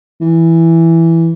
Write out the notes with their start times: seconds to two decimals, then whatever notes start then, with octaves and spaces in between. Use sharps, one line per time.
0.21 E3